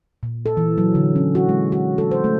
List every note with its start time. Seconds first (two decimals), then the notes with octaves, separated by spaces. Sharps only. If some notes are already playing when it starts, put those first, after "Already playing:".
0.23 A#2
0.46 A4
0.57 E3
0.78 F#3
0.95 D3
1.16 C#4
1.35 F#4
1.49 G#3
1.72 F#4
1.98 A4
2.11 C5
2.24 A3